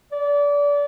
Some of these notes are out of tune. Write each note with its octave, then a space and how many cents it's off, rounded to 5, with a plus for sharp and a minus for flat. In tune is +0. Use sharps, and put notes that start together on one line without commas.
D5 -25